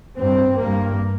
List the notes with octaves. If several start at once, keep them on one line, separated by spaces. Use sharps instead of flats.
G2 C4
G2 A#3